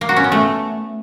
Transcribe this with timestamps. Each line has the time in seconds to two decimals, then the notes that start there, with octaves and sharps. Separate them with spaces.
0.01 A#3
0.09 F#4
0.16 C#4
0.24 B3
0.32 A3